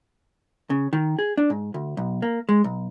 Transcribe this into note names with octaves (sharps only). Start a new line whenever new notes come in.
C#3
D#3
G#4
D4
G#2
D2
B1
A#3
G#3
B1